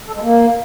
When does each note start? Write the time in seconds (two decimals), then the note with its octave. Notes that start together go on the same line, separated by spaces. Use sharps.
0.07 A4
0.15 G#3
0.23 A#3